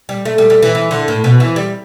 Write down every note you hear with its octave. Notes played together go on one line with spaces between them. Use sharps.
G3
A3
G3
G3
E3
E3
D3
A2
B2
E3
G3